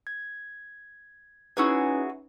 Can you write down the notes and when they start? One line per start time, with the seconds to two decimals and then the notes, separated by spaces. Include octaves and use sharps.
0.07 G#6
1.57 C#4 D#4 E4 F#4 G#4 B4